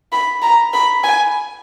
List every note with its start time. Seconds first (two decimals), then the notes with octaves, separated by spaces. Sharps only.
0.12 B5
0.42 A#5
0.74 B5
1.03 G#5